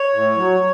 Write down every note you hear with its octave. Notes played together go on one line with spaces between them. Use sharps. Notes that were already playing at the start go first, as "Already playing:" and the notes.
Already playing: C#5
A2
F#3